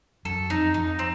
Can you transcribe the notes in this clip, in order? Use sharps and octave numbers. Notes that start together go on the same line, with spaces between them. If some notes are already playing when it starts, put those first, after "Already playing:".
F#2 F#3 A4
F2 F3 D#4
F2 F3 D#4
C4